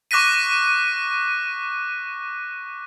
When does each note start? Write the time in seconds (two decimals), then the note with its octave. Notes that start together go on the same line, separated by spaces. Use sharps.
0.11 C#6 D6 F#6 A#6 B6 D#7